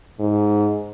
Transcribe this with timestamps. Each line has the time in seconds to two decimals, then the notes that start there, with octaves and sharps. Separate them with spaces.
0.19 G#2